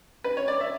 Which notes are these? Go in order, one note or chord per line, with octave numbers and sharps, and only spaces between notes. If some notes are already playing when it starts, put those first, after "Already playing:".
B4
C#5
D5
E5